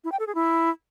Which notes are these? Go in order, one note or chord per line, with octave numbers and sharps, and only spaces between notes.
E4
G5
A4
G#4
E4